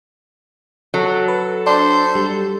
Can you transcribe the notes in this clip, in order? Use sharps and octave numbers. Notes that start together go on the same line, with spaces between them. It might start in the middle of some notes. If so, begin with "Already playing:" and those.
F#3 A4
B4
D4 C5
G3